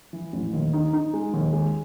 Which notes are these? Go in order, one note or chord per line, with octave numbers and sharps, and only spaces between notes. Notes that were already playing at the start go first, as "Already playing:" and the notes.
E3
A1
D#2
D#4
D#4
G#3
D#2
G#3